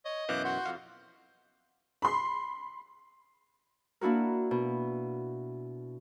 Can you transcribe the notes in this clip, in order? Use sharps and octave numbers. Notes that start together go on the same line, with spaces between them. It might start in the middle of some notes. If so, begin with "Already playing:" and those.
C#5 D#5
F#2 B2 E3 F5 D6 F#6 G6
F#4 F#5 C6
F2 F5
B5 C6
A#3 D4 E4 F#4 A#4
B2